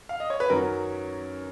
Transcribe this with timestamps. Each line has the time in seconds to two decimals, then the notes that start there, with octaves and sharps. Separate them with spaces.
0.09 F5
0.20 D#5
0.30 C#5
0.40 B4
0.50 F#2 D#3 F#3 C#4 F#4 A#4